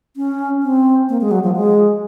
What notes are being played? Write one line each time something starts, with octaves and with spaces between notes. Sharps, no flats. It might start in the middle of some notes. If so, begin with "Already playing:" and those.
C#4
C4
A#3
G#3
F#3
F3
G#3